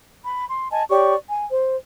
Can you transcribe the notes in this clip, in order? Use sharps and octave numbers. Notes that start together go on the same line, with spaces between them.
B5
C6
D#5 G#5 A5
G4 C#5 D5 C#6
G#5
C5